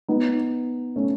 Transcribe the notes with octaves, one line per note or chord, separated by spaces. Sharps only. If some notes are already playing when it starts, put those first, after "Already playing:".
B3 D#4
A3 C#4